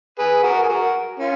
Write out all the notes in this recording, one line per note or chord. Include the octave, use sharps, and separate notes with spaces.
G#4 B4
F#4 A#4
G#4
F#4 A#4
C#4 F4